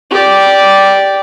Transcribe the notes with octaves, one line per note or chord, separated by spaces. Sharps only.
G4 D5